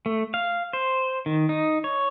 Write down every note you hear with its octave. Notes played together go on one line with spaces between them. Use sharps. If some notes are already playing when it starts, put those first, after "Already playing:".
A3
F5
C5
D#3
D#4
C#5